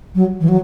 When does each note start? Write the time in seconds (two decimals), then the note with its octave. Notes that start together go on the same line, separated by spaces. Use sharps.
0.15 F#3
0.41 E3
0.48 F#3